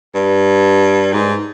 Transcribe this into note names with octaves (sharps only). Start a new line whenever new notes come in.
G2
G#2